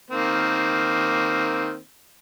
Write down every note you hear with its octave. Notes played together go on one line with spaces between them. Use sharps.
D#3 A#3 C4